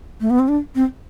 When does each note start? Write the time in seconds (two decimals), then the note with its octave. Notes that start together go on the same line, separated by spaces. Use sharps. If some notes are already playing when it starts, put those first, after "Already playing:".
0.21 A3
0.30 B3
0.39 C4
0.48 D4
0.75 C4